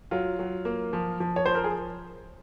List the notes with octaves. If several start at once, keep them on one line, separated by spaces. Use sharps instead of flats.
F#3 F4
F#3
A#3
F3
F3
C#5
F3 C5
A#4
G#4